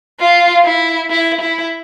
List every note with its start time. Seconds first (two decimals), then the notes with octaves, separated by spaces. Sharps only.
0.19 F4
0.65 E4
1.10 E4
1.41 E4